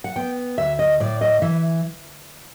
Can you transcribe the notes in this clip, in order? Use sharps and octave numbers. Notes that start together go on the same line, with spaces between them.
F#5
B3 G5
D2 E5
D#5
A2 D5
D#5
E3 E5